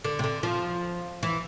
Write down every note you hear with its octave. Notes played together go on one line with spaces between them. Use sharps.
D3
C3
D3
F3
E3